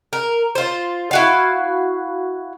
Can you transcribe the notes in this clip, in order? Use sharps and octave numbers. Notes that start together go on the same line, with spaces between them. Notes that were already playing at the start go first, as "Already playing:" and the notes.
A#4
F4 C5
E4 F#4 F5